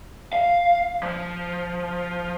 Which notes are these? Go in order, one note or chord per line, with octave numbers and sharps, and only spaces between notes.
F5
F3